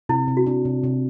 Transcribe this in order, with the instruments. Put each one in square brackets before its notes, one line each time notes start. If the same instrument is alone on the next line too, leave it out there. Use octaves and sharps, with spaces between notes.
[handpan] C3 [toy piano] E4
[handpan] C3
[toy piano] F#4
[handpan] D4
C3
C3